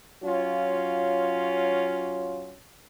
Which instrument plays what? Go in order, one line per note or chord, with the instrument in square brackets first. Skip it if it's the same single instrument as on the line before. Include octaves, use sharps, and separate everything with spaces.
[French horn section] F#3 C#4 F4